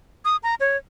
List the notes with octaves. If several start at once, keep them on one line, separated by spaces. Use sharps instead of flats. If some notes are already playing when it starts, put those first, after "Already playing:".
D#6
A#5
C#5